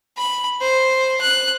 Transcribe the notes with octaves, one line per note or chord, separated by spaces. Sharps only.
B5
C5
F#6